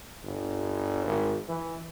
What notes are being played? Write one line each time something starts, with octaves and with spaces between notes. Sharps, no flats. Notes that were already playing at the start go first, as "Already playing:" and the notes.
G1
G#1
E3